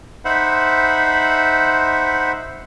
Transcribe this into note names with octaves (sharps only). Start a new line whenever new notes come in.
D#4 C5 E5 F#5 B5